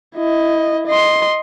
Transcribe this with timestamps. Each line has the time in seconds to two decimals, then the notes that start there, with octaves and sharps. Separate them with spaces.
0.16 E4 D#5
0.87 D#5 C6